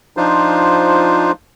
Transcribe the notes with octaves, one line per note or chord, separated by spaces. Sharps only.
F3 D4 D#4 F4 C5